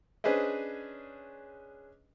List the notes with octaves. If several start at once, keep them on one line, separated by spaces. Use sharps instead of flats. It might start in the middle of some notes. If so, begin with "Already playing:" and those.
C#4 D4 G#4 B4 C5 D#5